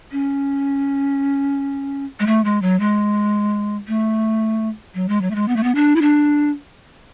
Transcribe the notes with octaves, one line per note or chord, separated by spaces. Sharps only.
C#4
G#3
A3
G#3
F#3
G#3
A3
F#3
G#3
F#3
A3
G#3
B3
A3
B3
D4
E4
D4